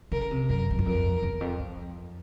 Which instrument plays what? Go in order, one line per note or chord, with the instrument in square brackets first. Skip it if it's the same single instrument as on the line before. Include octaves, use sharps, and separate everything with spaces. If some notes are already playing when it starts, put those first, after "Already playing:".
[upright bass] C#3 [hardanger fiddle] A#4
[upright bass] C3
[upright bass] F#2 [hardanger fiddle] A#4
[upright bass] G2
F#2
[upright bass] F2 [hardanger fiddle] A#4
[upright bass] E2
F2
F2